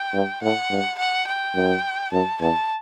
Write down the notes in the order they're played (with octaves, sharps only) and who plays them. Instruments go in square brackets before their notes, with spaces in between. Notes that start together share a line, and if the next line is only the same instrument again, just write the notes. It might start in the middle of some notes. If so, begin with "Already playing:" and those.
Already playing: [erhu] G5
[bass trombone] G2
[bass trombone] A2 [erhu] F#5
[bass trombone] G2
[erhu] F#5
G5
[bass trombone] F#2
[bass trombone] F#2 [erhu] A5
[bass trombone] E2 [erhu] A5